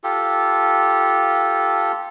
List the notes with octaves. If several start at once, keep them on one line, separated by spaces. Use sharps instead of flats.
F4 G4 A4